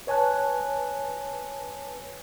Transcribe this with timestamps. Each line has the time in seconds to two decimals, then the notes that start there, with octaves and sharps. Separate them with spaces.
0.07 B4 C#5 G#5 A5 F#6